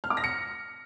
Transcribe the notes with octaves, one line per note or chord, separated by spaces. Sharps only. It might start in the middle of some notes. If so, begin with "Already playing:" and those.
F6
D6
A#6
C#7